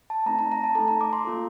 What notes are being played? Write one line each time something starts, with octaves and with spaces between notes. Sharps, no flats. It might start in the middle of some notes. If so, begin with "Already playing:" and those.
A5
A3 C4 D#4 A#5
A#5
A#5
A5
A3 D#4 A4 A#5
A#5
D6
C6
A#3 F4 A4